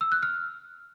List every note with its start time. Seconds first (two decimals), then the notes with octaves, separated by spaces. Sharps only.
0.01 E6
0.12 F#6
0.23 F6